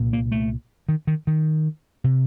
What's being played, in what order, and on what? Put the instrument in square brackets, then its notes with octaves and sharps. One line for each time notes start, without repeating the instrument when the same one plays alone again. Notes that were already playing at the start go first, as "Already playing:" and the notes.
Already playing: [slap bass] C2 A#2
A#3
A3
D#3
D#3
D#3
C3